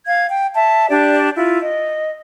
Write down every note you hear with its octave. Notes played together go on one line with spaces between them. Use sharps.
F5 G#6
G5
E5 A5
D4 G4 D5
E4 F4
D#5